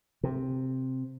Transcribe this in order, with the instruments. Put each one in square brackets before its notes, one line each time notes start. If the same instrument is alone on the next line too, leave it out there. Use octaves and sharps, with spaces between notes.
[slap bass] C3